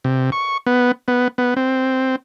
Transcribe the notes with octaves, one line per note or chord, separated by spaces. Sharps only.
C3
C#6
B3
B3
B3
C4